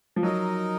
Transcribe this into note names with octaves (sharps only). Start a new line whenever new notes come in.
F3
F#3 D#4 A#4 D#5